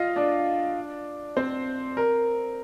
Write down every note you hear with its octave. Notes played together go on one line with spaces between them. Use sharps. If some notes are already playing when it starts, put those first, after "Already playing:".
Already playing: F4 D#5 F5
D4 D5
C4 C5
A#4